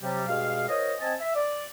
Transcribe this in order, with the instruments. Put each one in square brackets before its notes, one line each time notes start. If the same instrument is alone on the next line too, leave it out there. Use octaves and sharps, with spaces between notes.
[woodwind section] C3 F#3 G3
G2 B2 G#3 G#4 F5
F4 A#4 C5 C#5 D#5
C4 D#5 G#5 A5
E5
D5